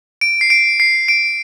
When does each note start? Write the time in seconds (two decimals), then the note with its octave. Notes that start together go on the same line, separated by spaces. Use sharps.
0.21 D7
0.41 C7
0.50 D7
0.80 C7
1.08 D7